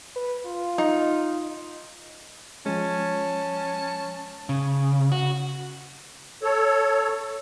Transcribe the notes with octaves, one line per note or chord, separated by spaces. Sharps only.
B4
F4
D#4
F3 G#3 C#4 A5
C#3
F#4
A4 C#5